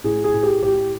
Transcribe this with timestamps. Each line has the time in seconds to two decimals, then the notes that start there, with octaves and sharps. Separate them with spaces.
0.04 A2 G#4
0.24 G#4
0.34 A2
0.43 G4
0.63 A2 G4